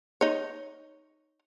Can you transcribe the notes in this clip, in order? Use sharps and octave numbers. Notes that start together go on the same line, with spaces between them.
D#4 C#5